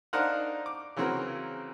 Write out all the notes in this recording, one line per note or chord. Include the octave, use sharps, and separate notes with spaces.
D4 D#4 A#4 C5 F5 F#5
D6
C#3 E3 F#3 C4 F#4 A#4